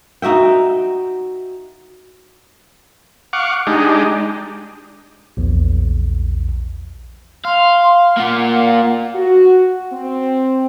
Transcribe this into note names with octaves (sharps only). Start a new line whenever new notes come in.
D#4 F#4 E5 G5
F5 F#5 C#6 D6
G#3 D4 D#4 G4
A#1 E2
F5 C6
A#3 F4 F#5
F#4
C4